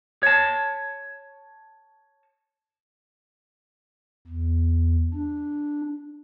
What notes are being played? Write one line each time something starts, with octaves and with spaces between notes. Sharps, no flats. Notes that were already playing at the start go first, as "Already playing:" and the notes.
C#5 A5
E2
D4